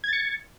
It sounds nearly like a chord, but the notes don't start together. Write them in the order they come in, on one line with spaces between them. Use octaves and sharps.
G#6 A6 C#7